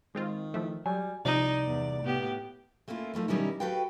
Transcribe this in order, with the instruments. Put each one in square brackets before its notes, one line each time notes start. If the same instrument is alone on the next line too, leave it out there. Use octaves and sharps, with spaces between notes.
[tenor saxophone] D#3 [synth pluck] G#3 C4 F4
[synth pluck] E3 F3 A3
[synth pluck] F#3 [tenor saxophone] G3 [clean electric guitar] G#5
[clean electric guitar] C2 [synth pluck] C3 F3 D7 [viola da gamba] D#4 [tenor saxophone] D5
[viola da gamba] E2
A2 B3 G4
[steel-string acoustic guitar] A3 A#3 C#4 E4 F4
F3 A3 A#3 D#4
B2 D#3 G3 C#4 D#4 E4
F#4 G4 A4 B4 F5 G5